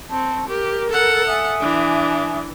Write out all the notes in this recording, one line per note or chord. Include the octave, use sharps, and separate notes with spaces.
C4 A5 C#6
G4 A#4
A4 F#5
E5 G#5 D#6
E3 D4